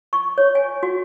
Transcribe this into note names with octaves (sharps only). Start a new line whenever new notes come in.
C#6
C#5
G#5
F#4